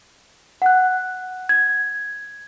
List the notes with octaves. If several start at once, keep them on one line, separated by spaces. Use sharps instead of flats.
F#5 F#6
G#6